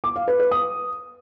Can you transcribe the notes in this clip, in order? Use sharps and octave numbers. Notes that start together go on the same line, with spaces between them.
D6
F5
B4
B4
D#6